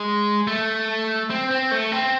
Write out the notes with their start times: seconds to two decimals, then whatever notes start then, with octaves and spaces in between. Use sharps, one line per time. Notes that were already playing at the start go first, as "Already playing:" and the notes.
Already playing: G#3
0.47 A3
1.30 C4
1.51 C4
1.71 A3
1.92 C4